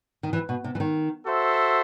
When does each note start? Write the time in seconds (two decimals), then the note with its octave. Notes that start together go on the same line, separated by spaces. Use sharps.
0.23 D#3
0.33 E3
0.49 B2
0.64 C3
0.75 E3
0.80 D#3
1.26 F#4 A4 C5 E5